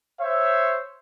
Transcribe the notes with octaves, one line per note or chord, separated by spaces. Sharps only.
C5 C#5 E5